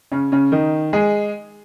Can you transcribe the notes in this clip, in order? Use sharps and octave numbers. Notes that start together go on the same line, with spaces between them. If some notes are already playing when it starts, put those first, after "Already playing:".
C#3 C#4
C#3 C#4
D#3 D#4
G#3 G#4